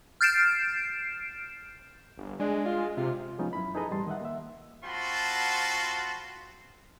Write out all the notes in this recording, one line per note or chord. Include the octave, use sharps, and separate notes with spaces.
F6 G6 A6 C7 D7 E7
G1
G#3 D4
F4
C3 F4
F3 G#3 B3 C#4 D#4 F4
F#2 E4 B5
D#4 G#4 A4 B4 D#5 A#5
E2 A2 G3 A5 C6
D#3 D#5 E5 F#5
A#3 E5
C4 F4 F#4 A5 B5 C6